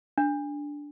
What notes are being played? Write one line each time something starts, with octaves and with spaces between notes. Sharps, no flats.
D4